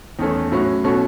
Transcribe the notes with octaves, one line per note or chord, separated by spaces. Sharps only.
E2 D#3 A3 C#4
A2 F#3 C#4 F#4
B2 A3 C#4 F#4